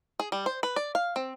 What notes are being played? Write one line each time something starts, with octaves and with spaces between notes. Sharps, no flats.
G#4
G3
C5
B4
D5
F5
C4